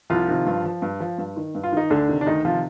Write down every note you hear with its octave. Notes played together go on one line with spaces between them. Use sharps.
C2 F3 F4
C3 D#3
G2
F3
G2
F3
G2
D#3
G2
F4
D#3 D#4
D2 D3 D4
C3 D#3
D4
D2 D#3 D#4
C3 D#3 F3 F4